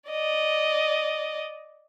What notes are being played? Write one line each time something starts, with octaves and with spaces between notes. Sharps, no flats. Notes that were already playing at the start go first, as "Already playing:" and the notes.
D5 D#5